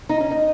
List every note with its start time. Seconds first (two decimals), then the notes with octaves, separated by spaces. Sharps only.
0.09 D#4
0.21 C#4
0.31 D#4